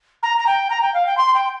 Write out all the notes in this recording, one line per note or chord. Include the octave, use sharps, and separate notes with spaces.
A#5
A#5
G5
A#5
G5
F5
G5
C6
G5